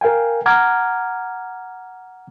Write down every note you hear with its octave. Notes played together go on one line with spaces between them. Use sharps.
A#4 F5 G5 G#5
F#5 A#5 D6 F6 G#6